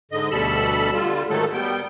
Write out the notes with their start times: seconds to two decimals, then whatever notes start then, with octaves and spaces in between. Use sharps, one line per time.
0.12 G#2 D3 D#5
0.31 D2 B2 G3 A4 B5 E6
0.94 D3 G3 F4
1.29 G#2 D#3 F#3 A3 A4
1.53 G3 B3 G5